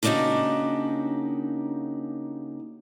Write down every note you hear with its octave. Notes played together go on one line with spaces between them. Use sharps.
C#3 A#3 D4 D#4 F#4 G4